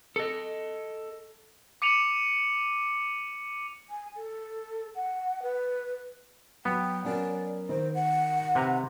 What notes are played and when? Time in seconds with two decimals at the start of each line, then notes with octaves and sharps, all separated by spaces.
0.16 A4 D#5
1.82 D6 C#7 D#7 F7 F#7
3.90 G#5
4.16 A4
4.95 F#5
5.43 B4
6.65 F#3 B3 G5
7.05 F#3 C#4 A#4 D5
7.69 D#3 C5
7.95 F#5
8.55 C3 B4 A#5